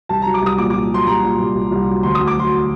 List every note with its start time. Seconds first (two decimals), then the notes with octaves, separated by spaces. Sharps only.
0.09 C2 A5
0.22 F#3 A#5
0.34 D6
0.42 C2 D#6
0.58 A#2 D6
0.70 A#2 D6
0.91 F#3 C6
1.07 C2 A#5
1.23 A#2
1.39 C2
1.55 C2
1.72 C2
1.88 F#3
2.03 D2 C6
2.15 D2 D#6
2.27 D6
2.35 F#3 C6